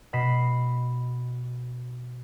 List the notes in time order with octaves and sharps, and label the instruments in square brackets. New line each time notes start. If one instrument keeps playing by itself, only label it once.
[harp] B2 D#5 B5 B6 C7 E7